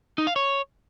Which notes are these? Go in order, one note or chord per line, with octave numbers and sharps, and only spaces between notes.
D#4
F5
C#5